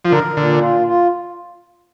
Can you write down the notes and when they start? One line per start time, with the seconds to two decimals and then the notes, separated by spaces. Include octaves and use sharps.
0.05 F3
0.12 D3 A#4
0.37 A#2 D3
0.62 F4
0.87 F4